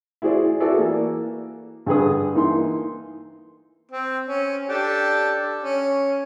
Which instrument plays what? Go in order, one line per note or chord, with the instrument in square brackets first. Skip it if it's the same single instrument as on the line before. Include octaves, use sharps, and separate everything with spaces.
[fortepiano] E4 F#4 G#4 C5 D5
F#4 G#4 A4 B4 D5 E5
E3 A#3
G2 D3 G#4 B4 D#6
E3 A#3 D#4 E4 C6
[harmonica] C4
C#4
D4 G4 A4
C#4